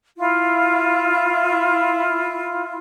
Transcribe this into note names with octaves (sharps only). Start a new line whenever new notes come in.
E4 F4